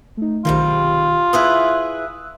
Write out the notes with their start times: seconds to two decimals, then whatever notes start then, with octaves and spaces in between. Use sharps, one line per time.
0.17 A3 D#4
0.45 B1 G#2 C3 D#3 G3 F4
1.33 E4 G#4 B4 D#6 E6 F#6